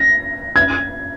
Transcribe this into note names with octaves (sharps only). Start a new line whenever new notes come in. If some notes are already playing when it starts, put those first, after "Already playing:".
Already playing: A#6
G#6